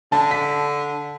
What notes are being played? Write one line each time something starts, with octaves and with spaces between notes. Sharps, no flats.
D3 A5
B6